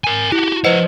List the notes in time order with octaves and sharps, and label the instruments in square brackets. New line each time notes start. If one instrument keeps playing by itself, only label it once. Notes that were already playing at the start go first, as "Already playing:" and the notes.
[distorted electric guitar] A#4 G#5
[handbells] E4 [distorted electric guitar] F#4 G4
[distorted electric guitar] F3 F#5 [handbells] B4 C5 D#5